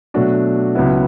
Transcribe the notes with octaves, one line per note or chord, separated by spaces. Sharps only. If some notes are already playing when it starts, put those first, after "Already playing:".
B2 F#3 A3 D4 F#4
C#2 C#3 F#3 B3 E4